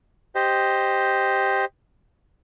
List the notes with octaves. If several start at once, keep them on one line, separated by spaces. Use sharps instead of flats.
G4 C5 D#5